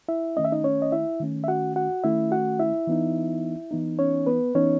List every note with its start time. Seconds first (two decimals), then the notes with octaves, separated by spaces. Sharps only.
0.08 E4 E5
0.37 D#3 A3 C#4 D#5
0.44 E5
0.52 D#4 D#5
0.64 C#4 C#5
0.82 D#5
0.92 E4 E5
1.20 D#3 A3 C#4
1.44 E5
1.48 F#4 F#5
1.76 F#4 F#5
2.04 D#3 A3 C#4 E4 E5
2.31 F#4 F#5
2.59 E4 E5
2.87 E3 B3 D#4
3.71 E3 B3 D#4
3.99 C#4 C#5
4.27 B3 B4
4.55 E3 B3 C#4 D#4 C#5